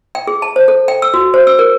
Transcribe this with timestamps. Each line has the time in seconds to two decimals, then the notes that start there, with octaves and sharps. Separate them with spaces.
0.15 G5
0.27 G#4
0.42 A5
0.56 C5
0.68 A4
0.88 G5
1.02 E6
1.14 F#4
1.34 C5
1.47 E6
1.59 A#4